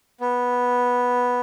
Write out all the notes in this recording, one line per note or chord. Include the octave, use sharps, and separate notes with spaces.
B3